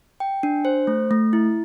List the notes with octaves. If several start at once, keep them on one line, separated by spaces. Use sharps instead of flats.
G5
D4
C5
A3
A3
E4